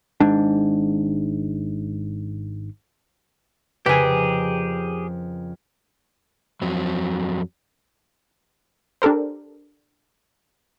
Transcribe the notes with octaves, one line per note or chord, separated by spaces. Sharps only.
G#1 G#2 D4
F2 C#3 G4 G#4 A#4 B4 G#5
F2 F#3 C4
D4 G4 A4 A#4 C5